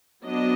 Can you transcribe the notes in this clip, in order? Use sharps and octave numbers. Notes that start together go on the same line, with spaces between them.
F#3 B3 D4 D#5